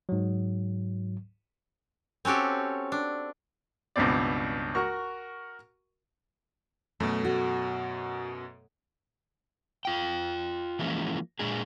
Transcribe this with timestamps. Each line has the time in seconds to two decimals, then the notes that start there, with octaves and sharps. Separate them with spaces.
0.09 G#2 F#3
2.25 C4 C#4 F#4 G4 A4
2.92 D4
3.96 C#2 G2 B2 C4 D5
4.75 F#4 A#4 C#6
7.00 F#2 B2 A3
7.25 F#4
9.85 F4 G5
10.79 E3 F3 G#3 A#3 C#4 E4
11.39 A#2 G#3 D4 G#4